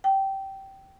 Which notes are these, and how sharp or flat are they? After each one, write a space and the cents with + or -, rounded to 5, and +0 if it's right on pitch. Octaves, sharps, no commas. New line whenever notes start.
G5 -15